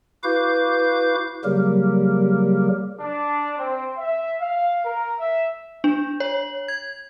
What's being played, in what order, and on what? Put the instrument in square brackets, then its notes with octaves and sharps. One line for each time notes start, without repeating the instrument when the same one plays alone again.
[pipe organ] E4 F#4 B4 F5 D6 G6
C#3 F#3 G3 A#3 G4 A#4
[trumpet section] D4
C4
E5
F5
A#4
E5
[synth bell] D4
C#5
G#6